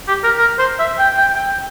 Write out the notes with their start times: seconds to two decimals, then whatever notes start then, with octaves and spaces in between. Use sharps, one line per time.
0.08 G4
0.24 A#4
0.38 A#4
0.59 C5
0.79 E5
0.99 G5
1.17 G5
1.36 G5